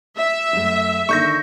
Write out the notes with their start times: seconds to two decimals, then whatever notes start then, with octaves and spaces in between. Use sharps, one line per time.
0.16 E5
0.53 F#2 A3
1.09 D3 D#3 A#3 C#6 G6 A#6